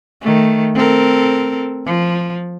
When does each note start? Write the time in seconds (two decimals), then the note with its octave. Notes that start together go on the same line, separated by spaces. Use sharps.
0.21 D#3 A3
0.74 C4 A4 A#4
1.86 F3